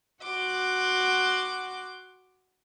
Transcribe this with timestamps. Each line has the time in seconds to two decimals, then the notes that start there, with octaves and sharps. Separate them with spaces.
0.24 F#4 F#5 C6 D6